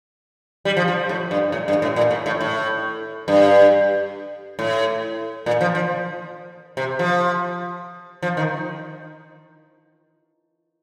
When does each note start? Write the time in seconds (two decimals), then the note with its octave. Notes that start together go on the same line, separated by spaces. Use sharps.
0.65 G3
0.77 F3
0.88 F3
1.09 A2
1.31 G2
1.52 A2
1.68 G2
1.82 A2
1.96 A#2
2.11 A2
2.26 A2
2.41 A2
3.28 G2
4.59 A2
5.46 A#2
5.61 F3
5.75 F3
6.77 C3
6.99 F3
8.23 F3
8.37 D#3